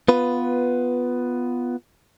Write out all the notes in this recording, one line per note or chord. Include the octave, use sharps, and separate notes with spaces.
B3 F4 B4